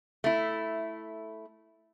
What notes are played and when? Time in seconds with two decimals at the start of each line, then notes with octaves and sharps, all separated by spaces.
0.24 A3 E4